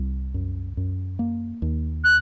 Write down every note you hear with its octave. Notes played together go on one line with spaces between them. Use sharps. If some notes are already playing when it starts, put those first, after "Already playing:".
Already playing: C2
F#2
F#2
A#3
D#2
F#6